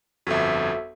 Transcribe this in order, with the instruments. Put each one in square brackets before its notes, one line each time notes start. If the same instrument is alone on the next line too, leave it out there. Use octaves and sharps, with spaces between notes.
[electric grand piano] G1 F2 [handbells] F#4 A4 E5